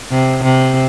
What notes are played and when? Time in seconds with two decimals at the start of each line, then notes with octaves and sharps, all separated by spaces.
0.11 C3
0.43 C3